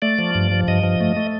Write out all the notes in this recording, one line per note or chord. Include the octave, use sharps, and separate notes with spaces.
A3 D5
F3
G2
F3
G2 D#5
F3
A3
A3